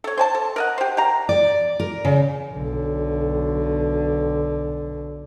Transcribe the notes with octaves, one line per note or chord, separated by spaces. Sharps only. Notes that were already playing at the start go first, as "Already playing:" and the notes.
A4 C#5
C5 G#5 A5
A4
A#4 D#5 F#5
G4 C5
G4 F5 A#5
D5
A#4
C#3
B1 D3